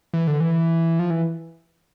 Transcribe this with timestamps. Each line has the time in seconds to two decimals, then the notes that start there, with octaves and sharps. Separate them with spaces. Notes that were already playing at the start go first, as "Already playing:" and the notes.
0.13 E3
0.27 D3
0.40 E3
0.99 F3
1.10 E3